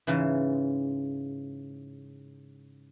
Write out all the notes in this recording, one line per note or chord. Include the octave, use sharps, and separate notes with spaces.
G#2 C#3 E3